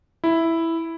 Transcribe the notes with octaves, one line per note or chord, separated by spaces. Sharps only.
E4